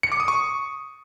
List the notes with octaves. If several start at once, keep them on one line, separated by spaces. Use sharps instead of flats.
C#7
D6
D#6
C#6